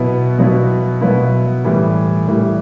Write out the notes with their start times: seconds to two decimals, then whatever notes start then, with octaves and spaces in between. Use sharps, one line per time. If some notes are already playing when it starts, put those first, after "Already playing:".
Already playing: B2 F#3 B3 E4
0.38 B2 F#3 B3 E4
1.01 B2 F#3 B3 E4
1.64 A2 E3 G3
2.28 A2 E3 G3